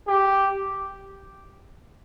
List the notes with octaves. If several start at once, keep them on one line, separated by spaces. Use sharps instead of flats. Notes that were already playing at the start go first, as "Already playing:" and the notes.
G4